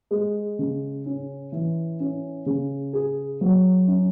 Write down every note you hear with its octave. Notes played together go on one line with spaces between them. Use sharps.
G#3
C#3
C#4
E3
C#4
C#3
G#4
F#3
C#4